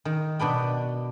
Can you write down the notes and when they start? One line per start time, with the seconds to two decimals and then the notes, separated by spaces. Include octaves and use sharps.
0.05 D#3
0.39 B2 D4 B4 G5